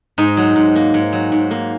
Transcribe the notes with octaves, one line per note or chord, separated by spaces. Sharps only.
G#2 D#4
F#3
G#2
A#3
G#2
F#3
G#2
A#3